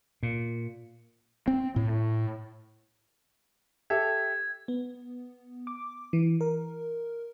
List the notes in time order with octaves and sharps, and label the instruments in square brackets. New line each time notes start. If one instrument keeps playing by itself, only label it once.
[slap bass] A#2
[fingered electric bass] C4
A2
[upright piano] G4 A4 E5 [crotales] G#6
[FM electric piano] B3
D6
E3
A#4